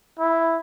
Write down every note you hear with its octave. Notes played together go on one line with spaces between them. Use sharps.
E4